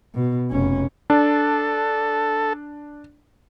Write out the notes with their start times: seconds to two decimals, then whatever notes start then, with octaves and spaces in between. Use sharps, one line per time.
0.14 B2
0.50 F1 C#4
1.10 D4 A4